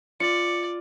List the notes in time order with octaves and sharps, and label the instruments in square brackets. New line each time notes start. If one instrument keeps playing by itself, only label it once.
[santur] F4 [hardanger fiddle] D5 [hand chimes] C#7